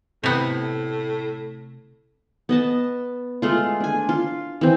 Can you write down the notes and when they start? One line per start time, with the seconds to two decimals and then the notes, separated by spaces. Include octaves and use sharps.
0.24 A2 C3 B3
2.49 B3 D#5 A5
3.42 G#3 A3 F4
3.80 D4 G#5
4.09 F4
4.61 E3 C4